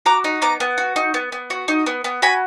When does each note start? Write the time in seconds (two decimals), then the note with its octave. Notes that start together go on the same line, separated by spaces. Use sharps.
0.06 F#4 A#5 D6
0.24 D#4
0.42 B3 A#5 D6
0.60 B3
0.78 F#4
0.96 D#4
1.14 B3
1.32 B3
1.50 F#4
1.68 D#4
1.86 B3
2.04 B3
2.22 F#4 G#5 B5